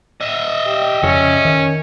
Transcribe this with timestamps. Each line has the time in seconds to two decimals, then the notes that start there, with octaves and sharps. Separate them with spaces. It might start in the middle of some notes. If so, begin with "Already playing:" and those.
0.21 D#5 E5
0.66 G4
1.03 F2 C#3 C#4
1.45 D#3